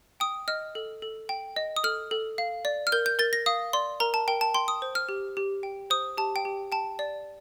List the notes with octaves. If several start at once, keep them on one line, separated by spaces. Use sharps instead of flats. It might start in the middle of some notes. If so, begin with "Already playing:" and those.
G5 D#6
D#5 F6
A4
A4
G5
D#5
D#6
A4 F6
A4
F5
D5
F6
A#4 G6
G6
A#4 A6
A#6
F5 D#6
D5 C6
A#4 A#5
A5
A#4 G5
A5
G5 C6
D#6
C5
F6
G4
G4
G5
C5 D#6
G4 A5
G5
G4
G5 A5
D5